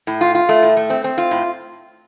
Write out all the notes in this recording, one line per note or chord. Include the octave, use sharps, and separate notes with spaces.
A2
F4
F4
A3
A2
A3
C4
C4
F4
A2